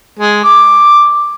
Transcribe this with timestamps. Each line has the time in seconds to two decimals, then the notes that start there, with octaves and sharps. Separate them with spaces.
0.19 G#3
0.44 D6